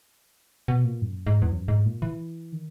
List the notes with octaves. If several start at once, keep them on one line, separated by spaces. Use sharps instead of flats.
B2
A#2
F#2
G#2
E2
F#2
G#2
A#2
E3
D#3